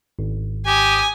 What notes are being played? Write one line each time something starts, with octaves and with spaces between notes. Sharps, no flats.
G#1
G4 G#5 D#6